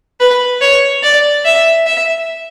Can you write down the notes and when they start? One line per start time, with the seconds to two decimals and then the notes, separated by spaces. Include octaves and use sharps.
0.20 B4
0.61 C#5
1.03 D5
1.45 E5
1.86 E5